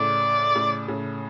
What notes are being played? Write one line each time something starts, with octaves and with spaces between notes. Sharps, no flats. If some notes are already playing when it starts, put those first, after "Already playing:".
Already playing: A2 C#3 D5
A2 C#3
A2 C#3